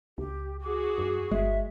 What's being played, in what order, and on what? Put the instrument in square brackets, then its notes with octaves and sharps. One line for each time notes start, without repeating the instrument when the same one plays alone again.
[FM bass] C#2 [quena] G4
[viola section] F#4 G#4 [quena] D6
[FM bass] F#2
[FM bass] G1 [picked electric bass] G#3 [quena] E5